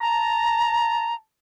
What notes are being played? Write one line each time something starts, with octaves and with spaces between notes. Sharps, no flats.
A5 A#5